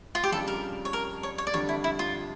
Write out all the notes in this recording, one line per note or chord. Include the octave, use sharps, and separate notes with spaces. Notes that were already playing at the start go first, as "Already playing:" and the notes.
F4
G4
F2 C#3 G3 D4 F4 A4
A#4
C#5
A#4
C#5
C#5
D5
F2 D3 G3 D4 C#5
E4
E4
F4